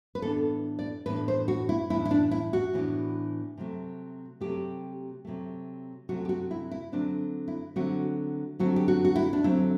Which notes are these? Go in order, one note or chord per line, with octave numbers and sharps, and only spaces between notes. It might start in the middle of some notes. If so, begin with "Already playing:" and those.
B4
A2 E3 B3 D4 A4
D5
A2 E3 B3 D4 B4
C5
F#4
E4
A2 E3 B3 D4 E4
E4
D4
E4
F#4
A2 E3 B3 D4
C3 F#3 A3
C3 F#3 A3 G4
C3 F#3 A3
C3 F#3 A3 F#4
G4
F#4
E4
E4
D3 F#3 A3 C4 D4
E4
D3 F#3 A3 C4 F#4
D3 F#3 A3 C4 F#4
G4
F#4
F#4
E4
D4
D3 F#3 A3 C4 E4